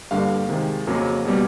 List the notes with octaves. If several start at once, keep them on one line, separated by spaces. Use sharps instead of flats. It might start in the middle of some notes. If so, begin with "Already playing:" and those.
G2 D3 G3 A#3 F5
C3 D#3 G#3
F2 C#3 F#3 A#3
B2 G3 A#3